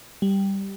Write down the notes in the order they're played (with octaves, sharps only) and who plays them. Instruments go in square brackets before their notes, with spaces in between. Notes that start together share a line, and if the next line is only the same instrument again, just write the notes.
[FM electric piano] G3